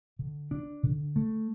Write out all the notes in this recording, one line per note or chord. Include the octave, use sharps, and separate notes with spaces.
D3
D4
D3
A3